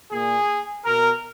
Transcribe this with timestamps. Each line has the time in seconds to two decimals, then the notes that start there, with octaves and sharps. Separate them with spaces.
0.12 A#2 G#4
0.86 B2 A#4